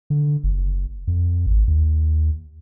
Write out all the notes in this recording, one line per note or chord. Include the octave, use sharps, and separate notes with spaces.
D3
F#1
F2
G#1
D#2